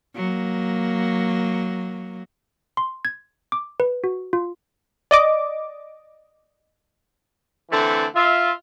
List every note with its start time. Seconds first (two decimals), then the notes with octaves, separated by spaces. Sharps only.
0.16 F#3 A#3
2.77 C6
3.05 G#6
3.52 D6
3.80 B4
4.04 F#4
4.33 F4
5.11 D5 D#5 D6
7.71 D3 E3 A3 C4
8.14 F4 E5